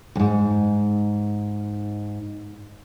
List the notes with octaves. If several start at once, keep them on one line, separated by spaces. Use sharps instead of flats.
D2 G#2